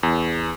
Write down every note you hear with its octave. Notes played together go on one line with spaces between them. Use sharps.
E2